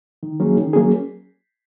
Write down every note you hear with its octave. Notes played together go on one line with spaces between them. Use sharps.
D#3
F#3 A#3 C#4 G#4
D#3
F#3 A#3 C#4 G#4